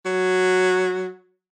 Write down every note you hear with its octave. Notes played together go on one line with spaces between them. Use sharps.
F#3